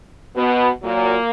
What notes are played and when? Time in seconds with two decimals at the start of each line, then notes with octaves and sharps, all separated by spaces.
0.36 B2 B3
0.83 A#2 F#3 A#3